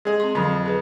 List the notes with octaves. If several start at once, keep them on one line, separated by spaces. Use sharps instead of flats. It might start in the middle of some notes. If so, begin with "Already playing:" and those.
G#3 G#4
C4 C6
F2 D3 F#3
G#4 B4